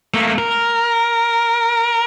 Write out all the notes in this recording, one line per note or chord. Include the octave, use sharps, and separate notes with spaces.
A3 A#3
A#4